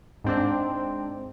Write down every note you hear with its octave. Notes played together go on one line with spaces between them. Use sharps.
G#2 C4 D4